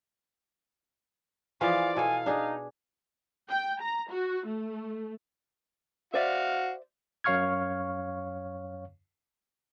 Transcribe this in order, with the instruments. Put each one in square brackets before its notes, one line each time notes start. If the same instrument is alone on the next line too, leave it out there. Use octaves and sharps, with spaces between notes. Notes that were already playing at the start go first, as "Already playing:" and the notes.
[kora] E3 F3 G#4 [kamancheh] D5 F5
[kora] B2 A4 [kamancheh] F5 [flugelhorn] G#5
[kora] D4 G#4 [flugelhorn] D#4
[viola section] G5
A#5
F#4
A3
[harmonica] F#4 F5 [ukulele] C5 D5 E5
[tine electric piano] F#2 C#5 F5 C#6 F6 G#6